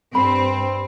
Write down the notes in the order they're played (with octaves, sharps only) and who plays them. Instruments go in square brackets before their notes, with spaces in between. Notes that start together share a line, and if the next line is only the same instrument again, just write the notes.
[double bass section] G2 [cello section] C4 [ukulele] B5